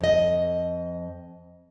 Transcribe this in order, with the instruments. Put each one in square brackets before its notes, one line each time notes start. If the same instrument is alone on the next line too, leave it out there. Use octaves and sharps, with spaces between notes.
[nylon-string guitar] F2 D#5